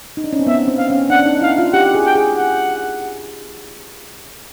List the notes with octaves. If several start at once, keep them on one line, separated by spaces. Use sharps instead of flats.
D#4
D4
C#4
C4
B3 E5
C4
F5
C#4
D4 F#5
D#4
E4 F5
F4
G4 F#5
G#4
G5
G#4
F#5